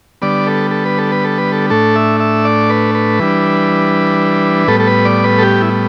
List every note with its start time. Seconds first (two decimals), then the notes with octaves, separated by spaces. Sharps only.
0.22 D3 G3 B3 D5
0.47 A4
0.71 A4
0.86 B4
0.98 A4
1.12 B4
1.24 A4
1.38 B4
1.52 A4
1.70 A2 A3 D4 A4
1.96 E5
2.20 E5
2.45 D5
2.70 B4
2.95 B4
3.19 E3 G3 D4
4.68 A2 G3 B3 A4
4.80 A4
4.87 B4
5.05 D5
5.24 B4
5.38 A4
5.42 G4
5.61 E4